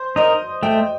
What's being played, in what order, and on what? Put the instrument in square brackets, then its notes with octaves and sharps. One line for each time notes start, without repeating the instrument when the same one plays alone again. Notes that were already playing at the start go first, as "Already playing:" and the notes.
Already playing: [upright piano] C5
[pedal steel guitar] D#4 A#4 [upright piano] D#5
[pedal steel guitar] A3 [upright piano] G5